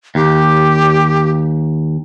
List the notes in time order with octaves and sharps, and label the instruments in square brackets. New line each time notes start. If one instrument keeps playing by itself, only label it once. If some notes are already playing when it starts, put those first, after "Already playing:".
[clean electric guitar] D#2 [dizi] G4